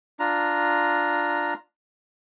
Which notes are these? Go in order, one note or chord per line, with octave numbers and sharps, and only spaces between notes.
D4 F4 A#5